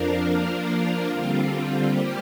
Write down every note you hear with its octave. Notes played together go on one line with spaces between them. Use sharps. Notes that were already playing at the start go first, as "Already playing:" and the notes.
Already playing: F2 F3 D4 F4 A#4
F3 A#3 D4 F4 A#4
D3 G3 C4 F4
G3 A#3 G4 C5